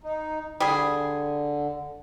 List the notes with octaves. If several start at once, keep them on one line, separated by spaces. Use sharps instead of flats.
D#4
D3 G3 G#4